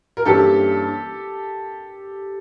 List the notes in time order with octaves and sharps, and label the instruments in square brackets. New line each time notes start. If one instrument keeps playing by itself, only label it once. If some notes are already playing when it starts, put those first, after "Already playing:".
[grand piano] A#4
[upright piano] G2 E3 G3 A#3 C#4 [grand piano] G4 A4